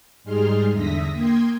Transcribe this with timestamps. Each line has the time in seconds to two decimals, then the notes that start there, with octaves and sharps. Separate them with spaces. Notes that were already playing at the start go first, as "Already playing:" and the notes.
0.24 G#2 G3 D#4 G#4 C6 F6
0.72 E2 D3 E5 D#6 A#6 B6
1.12 A#3 G5 C6 D#6 G#6